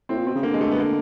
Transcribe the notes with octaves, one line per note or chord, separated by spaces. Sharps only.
A2 C4
A#2
B2 C4
C#3
D3 A#3
G#3
A3
B3
A#3